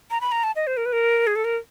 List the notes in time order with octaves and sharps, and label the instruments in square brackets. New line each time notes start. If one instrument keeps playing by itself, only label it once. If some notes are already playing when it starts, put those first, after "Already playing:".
[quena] A#5
B5
A#5
A5
D#5
C5
A#4
B4
A#4
G#4
A4
A#4